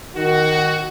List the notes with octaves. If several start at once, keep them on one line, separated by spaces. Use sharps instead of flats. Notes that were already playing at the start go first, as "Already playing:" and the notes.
D#3 F#4